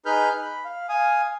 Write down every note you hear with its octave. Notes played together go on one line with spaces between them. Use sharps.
D#4 G#4 B4 B5 F6 G6
B5
F5
F5 G#5 D#6